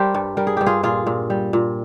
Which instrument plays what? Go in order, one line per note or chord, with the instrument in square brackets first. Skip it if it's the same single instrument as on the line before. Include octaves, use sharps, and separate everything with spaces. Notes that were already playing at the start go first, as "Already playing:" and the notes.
Already playing: [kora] G3 G4 A#4 C5
G2
G3 A#4
G#4
G2 G4
F4 G#4
A#2 F4 G#4
A#2
G3
A#2